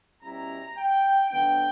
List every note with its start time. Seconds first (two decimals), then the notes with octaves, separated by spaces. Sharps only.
0.22 B2 G3 C#4 E4 A#5
0.76 G5
1.29 D3 F#3 B3 D4 G5